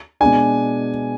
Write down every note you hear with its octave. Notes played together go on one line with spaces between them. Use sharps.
B2 G#3 D4 G#5